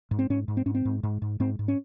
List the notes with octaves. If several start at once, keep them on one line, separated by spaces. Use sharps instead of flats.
G#2
C4
G#2 C#4
G#2
C4
G#2 C#4
C4
G#2
G#2
G#2
G#2 C4
G#2
C#4